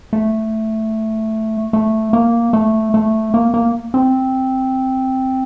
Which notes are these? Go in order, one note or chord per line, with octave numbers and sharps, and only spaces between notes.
A3
A3
A#3
A3
A3
A#3
A#3
C4